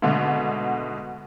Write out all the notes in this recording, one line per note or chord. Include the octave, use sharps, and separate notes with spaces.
G#2 B2 D3 A3